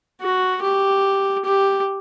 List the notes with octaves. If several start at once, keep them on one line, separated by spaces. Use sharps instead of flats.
F#4
G4
G4